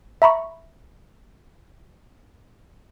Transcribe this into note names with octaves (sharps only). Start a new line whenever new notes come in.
E5 A#5 B5 C#6